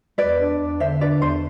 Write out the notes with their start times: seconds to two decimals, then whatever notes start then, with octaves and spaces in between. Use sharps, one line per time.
0.18 E2 B4 D5
0.39 D4
0.59 E2
0.80 D3 C5 E5
1.01 D4 B4 D5
1.22 E2 C5